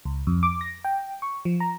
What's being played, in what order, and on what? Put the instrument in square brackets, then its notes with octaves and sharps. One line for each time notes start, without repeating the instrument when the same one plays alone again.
[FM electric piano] C#2
F2
D6
A#6
G5
C#6
F3
A#5